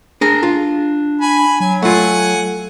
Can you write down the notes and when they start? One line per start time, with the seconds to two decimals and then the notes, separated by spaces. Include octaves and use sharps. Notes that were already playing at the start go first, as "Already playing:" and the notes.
0.21 D4 G#4 A#4
0.43 F4
1.21 G#5 B5
1.60 F#3 G#5
1.82 A3 F4 F#5 G#5